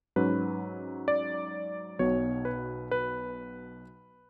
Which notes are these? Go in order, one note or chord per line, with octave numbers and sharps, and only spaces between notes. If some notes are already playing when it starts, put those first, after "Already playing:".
G#2 F#3 C#4 B4
D5
B1 B2 F#3 C#5
B4
B4